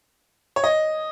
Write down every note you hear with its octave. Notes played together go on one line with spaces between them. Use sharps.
C#5
D#5